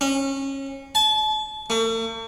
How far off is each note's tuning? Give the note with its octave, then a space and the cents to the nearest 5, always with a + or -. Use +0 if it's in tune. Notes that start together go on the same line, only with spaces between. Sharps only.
C#4 -25
A5 -40
A3 +45